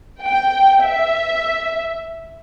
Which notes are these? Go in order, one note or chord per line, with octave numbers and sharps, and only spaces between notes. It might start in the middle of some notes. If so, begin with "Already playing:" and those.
G5
E5